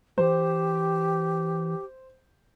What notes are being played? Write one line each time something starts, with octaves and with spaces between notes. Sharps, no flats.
E3 G4 C5